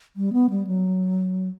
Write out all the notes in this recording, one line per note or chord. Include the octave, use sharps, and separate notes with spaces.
G3
B3
G3
F#3